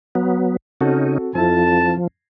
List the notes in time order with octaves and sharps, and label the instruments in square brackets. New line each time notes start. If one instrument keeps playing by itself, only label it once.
[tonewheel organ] F#3 B3
[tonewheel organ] C#3 C#4 D#4 [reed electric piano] C4 F#4 A4
[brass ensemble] F2 A5 [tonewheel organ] F3 [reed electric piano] C4 E4